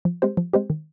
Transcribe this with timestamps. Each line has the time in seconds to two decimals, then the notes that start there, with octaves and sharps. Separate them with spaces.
0.05 F3
0.22 G#3 C4 G4 C5
0.37 F3
0.54 G#3 C4 G4 C5
0.70 D#3